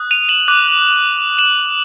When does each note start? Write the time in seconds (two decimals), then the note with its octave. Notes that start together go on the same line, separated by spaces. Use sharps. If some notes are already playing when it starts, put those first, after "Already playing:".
Already playing: D#6 F#6
0.11 D#7 F7
0.29 E7 F#7
0.48 D6 F#6
1.38 E7 F#7